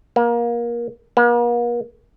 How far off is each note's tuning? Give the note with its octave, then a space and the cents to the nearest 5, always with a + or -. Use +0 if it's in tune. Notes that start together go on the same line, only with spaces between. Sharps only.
A#3 +25
A#3 +45